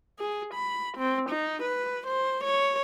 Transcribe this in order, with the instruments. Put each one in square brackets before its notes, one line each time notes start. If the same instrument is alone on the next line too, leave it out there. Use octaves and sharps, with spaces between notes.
[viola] G#4
B5
C4
D#4
B4
C5
C#5